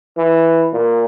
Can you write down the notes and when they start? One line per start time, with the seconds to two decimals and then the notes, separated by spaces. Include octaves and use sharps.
0.17 E3
0.73 A#2